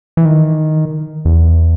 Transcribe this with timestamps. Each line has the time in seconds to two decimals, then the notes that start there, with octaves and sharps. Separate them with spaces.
0.17 E3
0.25 D#3
1.25 E2